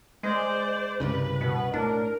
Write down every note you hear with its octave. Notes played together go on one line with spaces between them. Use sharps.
G#3 C5 D5
C2 G2 C#3 B4
B2
A2 D4 A#4